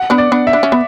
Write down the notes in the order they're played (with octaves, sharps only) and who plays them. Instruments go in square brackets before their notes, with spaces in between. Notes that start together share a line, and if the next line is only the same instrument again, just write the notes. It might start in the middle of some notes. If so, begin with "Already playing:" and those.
Already playing: [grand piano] F#5
[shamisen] B3 D4
[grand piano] D5
[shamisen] B3 D4
[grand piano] E5
[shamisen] D4
C#4
B3